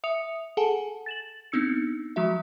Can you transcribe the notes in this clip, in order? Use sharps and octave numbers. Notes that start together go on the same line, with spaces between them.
E5 D#6 C#7 F7
G#4 A4 F#5 G#5 A5
A6 E7 F#7
B3 C4 D4 D#4 E6 C#7
F3 F#3 G#3 F#4 E5